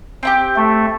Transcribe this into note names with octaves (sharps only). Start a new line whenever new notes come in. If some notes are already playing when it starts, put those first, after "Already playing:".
C4 E4 G4
A3